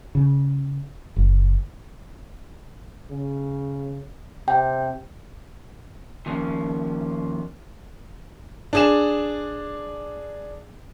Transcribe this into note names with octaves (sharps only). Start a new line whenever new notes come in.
C#3
F#1
C#3
C3 G5
D#3 F3 A#3 C#4
D4 G#4 E7